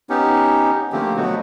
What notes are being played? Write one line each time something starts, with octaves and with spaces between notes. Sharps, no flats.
B3 C#4 D#4 G4
D3 F3 A3 A#3 C4 G4
B2 F3 F#3 A3 B3 F#4